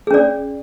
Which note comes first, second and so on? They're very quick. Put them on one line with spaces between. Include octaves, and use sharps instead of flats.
G#4 C#4 D5